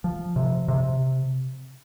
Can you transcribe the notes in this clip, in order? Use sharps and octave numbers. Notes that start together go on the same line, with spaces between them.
F3
C3
C3